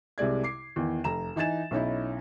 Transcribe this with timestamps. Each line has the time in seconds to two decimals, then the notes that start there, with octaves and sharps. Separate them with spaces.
0.18 C2 C3 G#3 D5 G#6
0.43 D6 C7
0.76 E2 D#3
1.04 F1 A#5 E7
1.36 E3 D#4 G#5 A6 E7
1.71 B1 C#4 D#4 E4